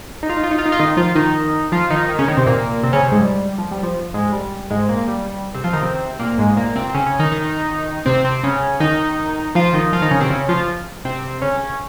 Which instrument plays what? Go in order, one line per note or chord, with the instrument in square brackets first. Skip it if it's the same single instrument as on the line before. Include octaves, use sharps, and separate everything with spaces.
[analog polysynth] D#4
F4
D#4
F4
D#4
F4
D#4
F4
D#3 D#4
F3 F4
D#3 D#4
F3 F4
D#3 D#4
D#3 D#4
C#3 C#4
D#3 D#4
C3 C4
A#2 A#3
C3 C4
C#3 C#4
C3 C4
G#2 G#3
G3
F3
G3
F3
G#2 G#3
G3
G#2 G#3
A#2 A#3
G3
C3 C4
F3 F4
D#3 D#4
C3 C4
A#2 A#3
G#2 G#3
A#2 A#3
C3 C4
C4
C#3 C#4
C#3 C#4
D#3 D#4
D#3 D#4
C3 C4
C3 C4
C#3 C#4
D#3 D#4
F3 F4
D#3 D#4
F3 F4
D#3 D#4
C#3 C#4
C3 C4
C#3 C#4
F3 F4
C3 C4
C#3 C#4